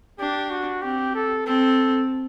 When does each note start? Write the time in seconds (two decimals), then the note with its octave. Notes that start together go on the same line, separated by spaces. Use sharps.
0.19 D4 G4
0.50 F#4
0.82 C4 G4
1.15 A4
1.46 C4 A4